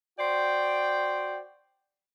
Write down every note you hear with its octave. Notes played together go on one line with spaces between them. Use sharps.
F#4 C5 D5 G5